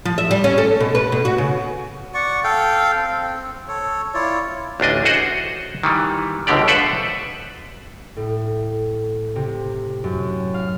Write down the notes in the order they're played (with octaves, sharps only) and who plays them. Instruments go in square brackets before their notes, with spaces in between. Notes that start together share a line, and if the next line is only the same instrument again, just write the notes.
[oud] F3
E5
G3
C#4
A4
B2
B4
B2
F#4
C#3
[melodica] D5 F#5 C#6
A4 F5 G5
C4
A4 C#5
E4 F4 C#5 D5
[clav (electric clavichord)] A1 D2 D4 D#5
F#4 G#4 C5 D#5 F#5
D#3 E3 G3
G1 C#2 B2 D3 G4 D5
A4 B4 C5 D5 E5 F#5
[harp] A2
C3
F#2
F5